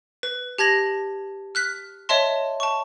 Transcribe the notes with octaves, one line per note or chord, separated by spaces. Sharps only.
B4
G4 A5 G#6 A#6 F#7
F6 F#6 B6
C#5 D#5 E5 A5 C6
A5 C#6